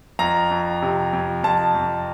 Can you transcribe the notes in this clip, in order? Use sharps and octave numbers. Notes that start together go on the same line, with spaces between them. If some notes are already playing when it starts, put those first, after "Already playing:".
F2 A#5
F2
C3
F2
F2 A5
F2